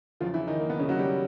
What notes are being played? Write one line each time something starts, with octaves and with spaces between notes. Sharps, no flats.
E2 C#3 F3 F#3 F4
E3 E4
D#3 D#4
A#3
B3
C#3 C#4
F#3 F#4
G3 G4